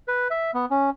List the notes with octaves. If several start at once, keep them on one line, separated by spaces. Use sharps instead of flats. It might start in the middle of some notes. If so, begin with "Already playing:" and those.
B4
E5
B3
C#4